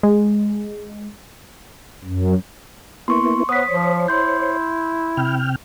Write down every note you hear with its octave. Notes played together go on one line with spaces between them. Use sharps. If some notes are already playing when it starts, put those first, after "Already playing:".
G#3
F#2
A#3 B3 E4 C6 C#6
B3 C5 C#5 D#6 B6
F3
E4 C6 G6
C3 G5 F6